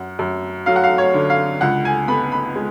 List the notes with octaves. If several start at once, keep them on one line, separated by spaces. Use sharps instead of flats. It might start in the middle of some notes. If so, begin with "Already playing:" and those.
Already playing: F#2 F#5
F#2
F#3 F5
F#5
F5
C#5
D3
F5
C#2 F#5
G#5
B3 B5
B5
G#3